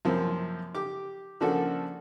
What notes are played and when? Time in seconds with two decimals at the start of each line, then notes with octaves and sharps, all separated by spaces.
0.05 F#2 C3 F3 A#3 C4
0.75 G4 D6
1.41 C#3 F3 A#3 D4 F#4 A4